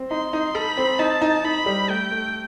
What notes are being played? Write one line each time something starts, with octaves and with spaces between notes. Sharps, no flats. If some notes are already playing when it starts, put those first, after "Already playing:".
Already playing: C4
D#4 C6
D#4
A4 B5
C4
D#4 A5
D#4
D#4 B5
G3
A3 G5
A3